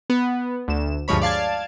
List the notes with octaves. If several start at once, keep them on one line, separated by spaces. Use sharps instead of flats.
B3
D2 E7
D2 G2 F3 G#3 C#5 B5
D5 F5 A5 G#6